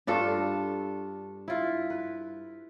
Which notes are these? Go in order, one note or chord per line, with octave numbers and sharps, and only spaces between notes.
G2 D4 F4 A4
E4 F4
B4